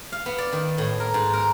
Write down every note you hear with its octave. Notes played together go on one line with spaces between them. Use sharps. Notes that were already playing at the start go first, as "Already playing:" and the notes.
F5
B3
D5
D#3
A2
A#4
G#2
A#4